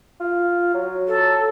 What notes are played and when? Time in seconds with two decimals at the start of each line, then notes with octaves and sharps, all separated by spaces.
0.20 F4
0.74 F#3
1.08 A4